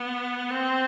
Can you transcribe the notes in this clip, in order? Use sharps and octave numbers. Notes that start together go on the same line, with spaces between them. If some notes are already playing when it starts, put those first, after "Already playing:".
Already playing: B3
C4